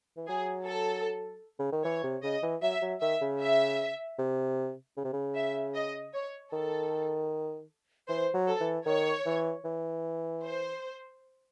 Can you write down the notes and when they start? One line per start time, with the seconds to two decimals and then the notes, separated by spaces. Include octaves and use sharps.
0.17 E3
0.28 F#3 G#4
0.67 A4
1.59 C#3
1.72 D#3
1.84 E3 C#5
2.04 C3
2.23 C#3 D#5
2.43 E3
2.62 F#3 E5
2.82 F#3
3.01 D#3 E5
3.21 C#3
3.41 E5
4.19 C3
4.97 C#3
5.04 C3
5.13 C#3
5.36 E5
5.74 D#5
6.13 C#5
6.53 D#3 A4
8.08 E3 C5
8.34 F#3
8.48 A4
8.61 E3
8.86 D#3 C#5
9.25 E3
9.65 E3
10.43 C5